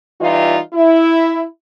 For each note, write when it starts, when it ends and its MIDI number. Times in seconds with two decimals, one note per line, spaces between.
0.21 0.58 52
0.21 0.58 55
0.21 0.58 63
0.21 0.58 65
0.74 1.44 64